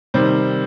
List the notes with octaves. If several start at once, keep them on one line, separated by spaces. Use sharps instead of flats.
C3 D#3 G3 C5